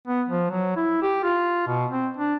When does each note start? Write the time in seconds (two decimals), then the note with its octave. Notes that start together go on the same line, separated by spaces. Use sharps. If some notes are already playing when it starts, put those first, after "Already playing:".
0.07 B3
0.28 F3
0.51 F#3
0.76 E4
1.02 G4
1.23 F4
1.67 B2
1.90 C4
2.17 D4